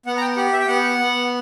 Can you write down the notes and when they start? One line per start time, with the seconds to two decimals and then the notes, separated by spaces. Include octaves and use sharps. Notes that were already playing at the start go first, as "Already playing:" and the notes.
0.06 B3 F#5
0.17 A#5
0.21 G5
0.36 G4 F#5
0.52 E5
0.61 G5
0.68 B3 F#5
0.98 B3